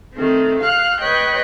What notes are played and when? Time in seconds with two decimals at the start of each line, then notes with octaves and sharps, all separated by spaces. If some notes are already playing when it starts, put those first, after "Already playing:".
0.13 D#3 A3 C4
0.61 F5 F6 F#6
1.00 B4 C#5 D#5 G5 F#6